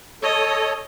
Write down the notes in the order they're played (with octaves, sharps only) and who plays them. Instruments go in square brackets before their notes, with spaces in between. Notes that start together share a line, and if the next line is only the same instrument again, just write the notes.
[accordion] A4 C#5 [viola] D#5